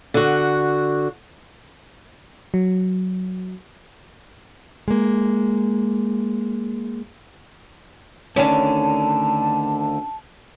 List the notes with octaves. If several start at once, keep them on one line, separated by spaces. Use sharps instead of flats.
D3 F#4
F#3
G#3 A#3
D2 D3 D#3 C#4 D4 A5